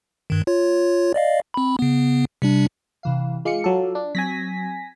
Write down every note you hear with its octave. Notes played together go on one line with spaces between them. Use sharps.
G2 D#3
F4 C#5
D5 D#5 F5
C4 B5
C#3 B3
C3 G3 D4
C3 E3 F5
G#3 F4 F5 D6 C#7
F#3 A4
D4
F#3 C4 G#5 A#6 B6